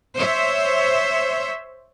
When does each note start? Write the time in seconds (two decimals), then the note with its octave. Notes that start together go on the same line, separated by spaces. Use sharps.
0.16 C5 C#5 E5